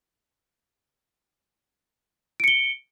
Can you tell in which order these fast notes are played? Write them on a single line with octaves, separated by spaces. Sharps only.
D7 C#7 G7